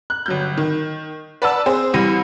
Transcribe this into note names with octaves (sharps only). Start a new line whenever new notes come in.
F#6
G1 F#3 G6
D#3
B4 D5 F#5 A5 E6
C4 G#4 C5
C2 E3 G3 B5 A#6 D#7